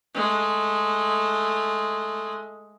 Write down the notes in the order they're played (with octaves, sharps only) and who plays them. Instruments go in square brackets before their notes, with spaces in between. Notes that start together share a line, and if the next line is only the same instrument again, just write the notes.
[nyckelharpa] G#3 A3